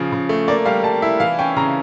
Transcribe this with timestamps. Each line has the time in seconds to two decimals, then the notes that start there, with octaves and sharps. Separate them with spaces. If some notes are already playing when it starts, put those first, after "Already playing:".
Already playing: C#3 F3
0.12 C#3
0.29 A3
0.48 A#3 D5
0.65 G3 F5
0.84 G3 A5
1.02 E4 E5
1.20 E3 F5
1.39 C#4 G5
1.56 C#3 A#5